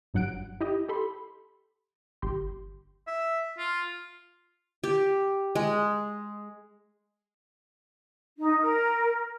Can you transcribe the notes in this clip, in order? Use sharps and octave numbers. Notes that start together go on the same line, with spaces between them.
G1 G2 F#3 F#5 F#6 D7
E4 G4 D#5
G4 A4 B5 C6
G1 G4 C6
E5
F4
G4
G#3
D#4
A#4